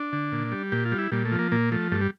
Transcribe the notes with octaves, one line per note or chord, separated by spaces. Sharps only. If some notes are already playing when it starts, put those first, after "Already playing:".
Already playing: D4
D3
A#2
G3
A#2 G4
F4
G3
E4
A#2 G3
A3
F3
A#3
A#2 A#3
F3 A3
G2 A3
G3